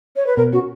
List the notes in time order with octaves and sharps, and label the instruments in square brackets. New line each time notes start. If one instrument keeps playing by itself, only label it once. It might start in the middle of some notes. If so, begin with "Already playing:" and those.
[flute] C#5
B4
[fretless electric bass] B2 [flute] A#4
[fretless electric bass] C#4 [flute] F#4